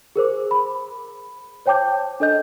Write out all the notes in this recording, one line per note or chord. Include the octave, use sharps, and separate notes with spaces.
G#4 A#4 C5 D6
B5
C5 C#5 G5 A5 D6 G6
D4 A4 D#5 G6